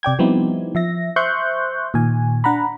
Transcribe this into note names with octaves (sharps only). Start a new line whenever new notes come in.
C3 D5 G5 G#6
F3 G3 B3 C4 D#4 E4
F3 E5 A#6
C5 E5 C6 C#6 F#6 G6
A#2 D#3 G#5
D4 F#5 A#5 B5